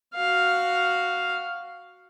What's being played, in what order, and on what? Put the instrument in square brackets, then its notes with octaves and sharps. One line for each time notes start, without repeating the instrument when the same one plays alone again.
[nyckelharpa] F#4 F5